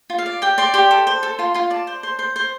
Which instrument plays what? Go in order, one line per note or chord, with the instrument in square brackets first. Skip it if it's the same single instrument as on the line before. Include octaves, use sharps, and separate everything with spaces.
[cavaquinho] F4
F5
D5
G4 G5
D5 C6
G4 C6
A4
C5
A4
F4 C6
F4 C6
D5 A5
C5
C5
C5
C5